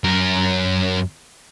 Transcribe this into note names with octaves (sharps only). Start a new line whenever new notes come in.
F#2 A#4